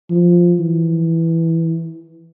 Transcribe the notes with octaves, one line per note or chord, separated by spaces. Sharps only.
F3
E3